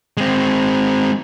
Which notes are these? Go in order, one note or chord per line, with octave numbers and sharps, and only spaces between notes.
G#3 C4